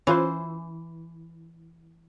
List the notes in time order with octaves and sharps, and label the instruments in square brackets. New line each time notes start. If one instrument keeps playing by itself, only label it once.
[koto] E3 [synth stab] C#4 F4 C5